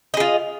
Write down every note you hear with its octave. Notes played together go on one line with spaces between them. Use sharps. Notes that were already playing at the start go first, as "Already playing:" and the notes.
F4 G#4 D#5